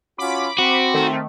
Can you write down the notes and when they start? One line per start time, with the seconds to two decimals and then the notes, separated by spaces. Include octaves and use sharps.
0.18 C#4 F4 F#4 B5 D6
0.58 C4 F#4
0.94 D#3 A3